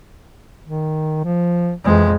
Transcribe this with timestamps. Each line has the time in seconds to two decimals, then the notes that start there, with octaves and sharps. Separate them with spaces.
0.67 D#3
1.24 F3
1.84 F2 E3 G#3